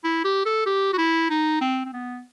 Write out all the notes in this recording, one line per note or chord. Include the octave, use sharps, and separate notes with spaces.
E4
G4
A4
G4
F#4
E4
D#4
C4
C4
B3